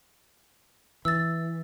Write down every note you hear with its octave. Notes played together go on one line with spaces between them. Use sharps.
E3 E6 A6